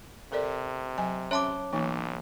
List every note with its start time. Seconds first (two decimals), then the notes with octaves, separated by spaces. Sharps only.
0.32 C3 A4 A#4 D5
0.98 F#3 G#5
1.31 C#4 C#5 E5 A5 C6 D6
1.72 B1 E3 A#3 D#4